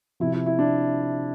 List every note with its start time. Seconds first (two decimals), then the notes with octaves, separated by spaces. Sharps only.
0.20 C3 F3 E4
0.33 E4
0.46 E4
0.59 D4